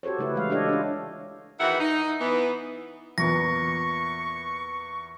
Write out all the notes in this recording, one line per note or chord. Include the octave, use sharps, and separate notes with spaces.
F#4 G4 A4 C5 C#5
C#3 A3 E4 B4
E3 G#3 F5
D4 F4 G4 A4 C#5 D#5
D4 F4
E2 D#3 E3 F#4 E5 F#5
D#4
E3 B3
E2 A#2 B3 C#6 A#6